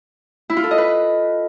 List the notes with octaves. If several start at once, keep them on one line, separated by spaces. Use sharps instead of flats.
E4
F4
A4
D#5
B4